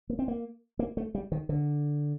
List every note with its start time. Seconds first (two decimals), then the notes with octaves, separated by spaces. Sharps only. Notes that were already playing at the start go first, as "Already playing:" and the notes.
0.09 A#3
0.19 C4
0.28 A#3
0.79 A#3
0.97 A3
1.15 G3
1.32 D#3
1.49 D3